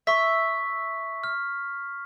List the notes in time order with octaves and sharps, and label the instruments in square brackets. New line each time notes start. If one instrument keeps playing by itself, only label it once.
[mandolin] E5 [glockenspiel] C#6 B6
[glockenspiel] F6